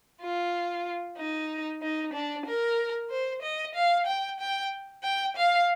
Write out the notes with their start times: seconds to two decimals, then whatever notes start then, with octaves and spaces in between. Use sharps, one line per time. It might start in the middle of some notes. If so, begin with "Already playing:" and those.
0.21 F4
1.17 D#4
1.82 D#4
2.13 D4
2.46 A#4
3.10 C5
3.42 D#5
3.75 F5
4.07 G5
4.40 G5
5.03 G5
5.37 F5